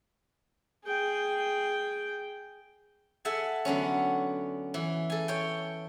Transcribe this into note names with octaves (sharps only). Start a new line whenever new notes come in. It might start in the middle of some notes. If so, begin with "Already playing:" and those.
G#4 G5
A4 E5 F#5 G#5
D3 F#3 B3 C#4
E3
A4 G#5
C#5 G5